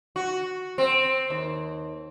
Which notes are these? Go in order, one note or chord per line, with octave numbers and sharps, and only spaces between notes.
F#4
C4
D#2